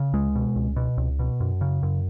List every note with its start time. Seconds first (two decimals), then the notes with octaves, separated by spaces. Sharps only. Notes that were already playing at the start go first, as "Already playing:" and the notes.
Already playing: C#3
0.13 C#2 G#3
0.35 B2
0.56 C#2
0.76 B2
0.97 C#2
1.19 B2
1.40 F#2
1.61 C#3
1.83 F#2